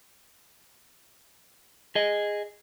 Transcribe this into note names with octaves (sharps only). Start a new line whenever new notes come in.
G#4 D#5